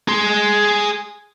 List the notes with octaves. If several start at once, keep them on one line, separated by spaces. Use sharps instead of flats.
G#4 C6